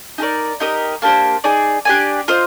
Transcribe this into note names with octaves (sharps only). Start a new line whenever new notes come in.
D#4 G4 A#4 D5
D#4 G4 A#4 D#5
A#3 D4 G4 C5
D#4 G#4 D5
D4 G4 D5 G#5
F4 C5 D#5